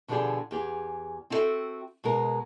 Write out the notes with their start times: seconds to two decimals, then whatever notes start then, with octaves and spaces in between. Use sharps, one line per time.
0.08 B2 D3 F3 D4 G4 G#4
0.51 E2 G4 G#4
1.30 C4 E4 F#4 A4 E5 G5
2.04 B2 G#3 G#4 A#4